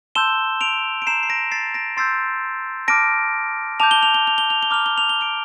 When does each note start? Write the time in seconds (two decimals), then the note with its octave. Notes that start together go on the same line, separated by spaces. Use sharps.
0.15 A5 C6 E6 G6 E7 G7
0.61 D7 F7
1.02 D7
1.06 A#5 E6 G6 C7 E7
1.23 C7
1.30 A#6 D7
1.52 A6 C7
1.74 A#6 D7
1.97 C6 E6 G6 A6 C7
2.88 A5 D6 F6 A#6 D7
3.80 A5 D6 G6 F7
3.91 G7
4.03 F7
4.14 G7
4.27 F7
4.38 G7
4.50 F7
4.63 G7
4.71 A#5 D6 F6 F7
4.86 G7
4.98 F7
5.09 G7
5.21 D7 F7